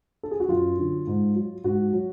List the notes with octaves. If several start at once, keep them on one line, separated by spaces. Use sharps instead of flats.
A4
G#4
F#4
F#2 F4
D3 F#3
G#2
F#3
G#2 F#4
F#3